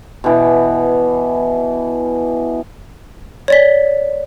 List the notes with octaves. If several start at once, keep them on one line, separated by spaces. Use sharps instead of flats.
B2 E3
C#5 D5 B6